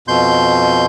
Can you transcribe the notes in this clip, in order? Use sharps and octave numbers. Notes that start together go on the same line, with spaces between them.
F2 B2 C6 G6